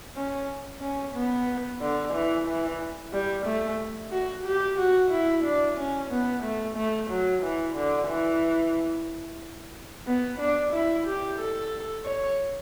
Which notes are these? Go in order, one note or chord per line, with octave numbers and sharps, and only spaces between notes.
C#4
C#4
B3
D3
E3
E3
G3
A3
F#4
G4
F#4
E4
D4
C#4
B3
A3
A3
F#3
E3
D3
E3
B3
D4
E4
G4
A4
C#5